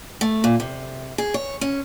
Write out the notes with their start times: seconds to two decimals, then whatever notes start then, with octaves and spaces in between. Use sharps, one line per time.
0.21 A3
0.44 A#2
0.60 C3
1.18 G#4
1.34 C#5
1.61 C#4